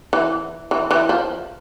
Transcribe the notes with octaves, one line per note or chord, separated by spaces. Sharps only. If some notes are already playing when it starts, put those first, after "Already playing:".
E3
E3
E3
F3